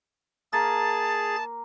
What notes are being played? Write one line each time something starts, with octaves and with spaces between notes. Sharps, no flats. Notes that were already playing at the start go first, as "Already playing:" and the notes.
A#3 G#4 A5 A6